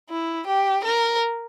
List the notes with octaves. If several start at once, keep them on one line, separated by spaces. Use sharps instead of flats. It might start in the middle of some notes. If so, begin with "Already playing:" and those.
E4
G4
A#4